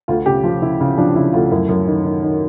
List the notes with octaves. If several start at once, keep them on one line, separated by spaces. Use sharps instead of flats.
D2 F4
C#3 G4
F3 F4
C#3 E4
C#3
F3 D4
C#3 E4
D2 F4
F#2 E4
F#2
D#3
D#3
D#3